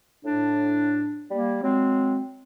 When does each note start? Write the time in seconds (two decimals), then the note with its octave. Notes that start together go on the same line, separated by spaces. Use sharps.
0.24 A2 D4
1.31 G3 A#3
1.63 F#3 G#3 C4